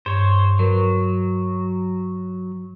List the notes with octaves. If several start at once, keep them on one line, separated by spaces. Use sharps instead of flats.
G2 C5 C#5
F#3 A#4 B4